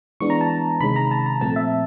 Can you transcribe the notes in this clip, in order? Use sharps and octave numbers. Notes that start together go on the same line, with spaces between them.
E3 G#3 B3 D4 C#6
A#5
A5
C3 D#3 G#3 C#4 B5
A#5
A5
A#5
A#2 F3 A3 C4 A5
E5